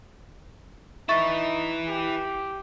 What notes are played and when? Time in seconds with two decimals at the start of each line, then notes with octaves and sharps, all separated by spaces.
1.09 D#4 E4 B4 E5 C#6 A6
1.89 G4